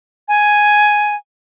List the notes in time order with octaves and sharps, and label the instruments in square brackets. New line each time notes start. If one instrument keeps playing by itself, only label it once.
[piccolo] G#5